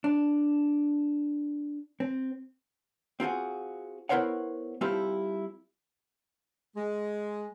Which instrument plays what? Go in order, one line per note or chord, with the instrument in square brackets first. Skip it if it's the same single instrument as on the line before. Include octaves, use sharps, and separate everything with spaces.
[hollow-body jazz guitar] D4
C4
C4 F4 F#4 G#4
B3 E4 A#4 C5 C#5 F#5
G3 C4 E4 F4 G4 A4
[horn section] G#3